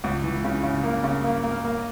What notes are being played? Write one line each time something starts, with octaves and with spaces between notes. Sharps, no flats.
C#2
E3
C#3
C#3
A#3
C#3
A#3
A#3
A#3